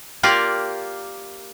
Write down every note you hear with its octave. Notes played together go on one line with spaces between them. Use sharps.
A#3 F4 G4 A#4 D5